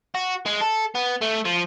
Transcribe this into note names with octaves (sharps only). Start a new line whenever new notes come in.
F#4
G#3
A4
B3
A3
F3